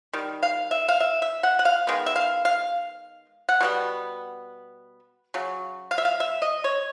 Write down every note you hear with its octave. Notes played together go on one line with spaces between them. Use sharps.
D#3 G3
F5
E5
F5
E5
E5
F#5
F#5
F5
D#3 G#3 B3
E5
F5
F5
F#5
B2 G3 B3
C#3 F#3
F5
E5
F5
E5
D#5
C#5